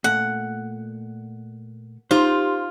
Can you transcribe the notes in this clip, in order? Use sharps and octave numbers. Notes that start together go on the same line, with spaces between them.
A#2 A3 F#5
D#4 F4 G4 C5